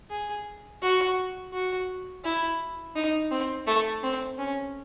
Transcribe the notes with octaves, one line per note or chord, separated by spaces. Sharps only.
G#4
F#4
F#4
E4
D#4
C4
A3
C4
C#4